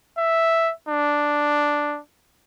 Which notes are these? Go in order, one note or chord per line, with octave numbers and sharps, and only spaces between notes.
E5
D4